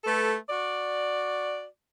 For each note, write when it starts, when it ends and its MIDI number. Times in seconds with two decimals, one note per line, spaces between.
0.04 0.34 57
0.04 0.34 69
0.04 0.34 71
0.49 1.66 66
0.49 1.66 74